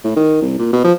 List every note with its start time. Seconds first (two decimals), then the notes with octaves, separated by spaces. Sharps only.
0.04 A2
0.16 D#3
0.42 C2
0.59 A#2
0.73 B2
0.84 F3